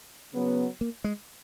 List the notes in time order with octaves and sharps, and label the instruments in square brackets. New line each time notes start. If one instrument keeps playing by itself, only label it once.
[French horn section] C#3 F#3 B3
[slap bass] A#3
G#3